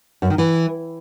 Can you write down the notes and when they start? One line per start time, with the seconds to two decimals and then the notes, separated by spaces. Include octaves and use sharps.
0.22 F#2
0.30 D#3
0.38 E3